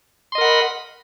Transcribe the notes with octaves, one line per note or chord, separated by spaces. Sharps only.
A#4 D#5 F#5 B5 C6